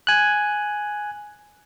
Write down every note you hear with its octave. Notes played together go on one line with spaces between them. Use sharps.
G#5 F#6